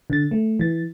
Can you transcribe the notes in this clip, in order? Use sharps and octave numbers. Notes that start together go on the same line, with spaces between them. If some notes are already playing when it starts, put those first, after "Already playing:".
D3 A6
A3
E3 A6